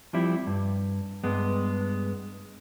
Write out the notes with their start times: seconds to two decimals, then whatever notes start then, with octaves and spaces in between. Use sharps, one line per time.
0.13 F3 G3 C4 E4
0.47 G2
1.24 G2 G#3 B3